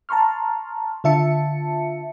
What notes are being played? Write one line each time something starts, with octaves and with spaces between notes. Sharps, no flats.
A5 A#5 C6 C#6 F6
D3 F4 E5 A5 C#7